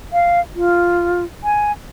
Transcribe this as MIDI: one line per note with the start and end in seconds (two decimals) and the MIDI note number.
0.13 0.40 77
0.56 1.24 65
1.44 1.72 80